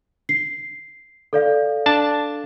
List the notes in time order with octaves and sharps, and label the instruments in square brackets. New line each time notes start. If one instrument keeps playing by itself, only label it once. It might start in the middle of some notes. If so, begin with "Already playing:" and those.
[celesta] C7
A4 D5 F5
[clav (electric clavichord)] D4 A5